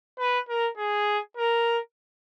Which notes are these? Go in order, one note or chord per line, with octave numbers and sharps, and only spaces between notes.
B4
A#4
G#4
A#4